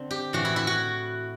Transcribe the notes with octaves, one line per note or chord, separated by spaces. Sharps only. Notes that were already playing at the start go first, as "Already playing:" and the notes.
Already playing: D3 C4
G4
A2 E3 F#4
E4
E4
F#4